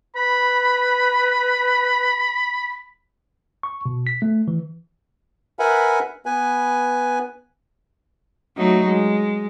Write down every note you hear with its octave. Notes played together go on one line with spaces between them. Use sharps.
B4 B5
C#6
B2
B6
A3
E3
A#4 B4 E5 F#5 G#5 B5
B3 B4 G#5
F#3 A3 D#4
G#3